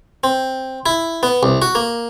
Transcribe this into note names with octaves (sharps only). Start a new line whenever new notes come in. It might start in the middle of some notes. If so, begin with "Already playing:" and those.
C4
E4
B3
C2
F#4
A#3